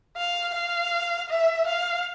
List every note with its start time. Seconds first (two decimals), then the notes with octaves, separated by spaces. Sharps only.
0.16 F5
0.54 F5
1.30 E5
1.67 F5